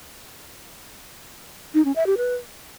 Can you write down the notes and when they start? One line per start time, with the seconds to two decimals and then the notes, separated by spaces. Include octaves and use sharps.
1.74 D#4
1.85 C#4
1.96 E5
2.06 G4
2.17 B4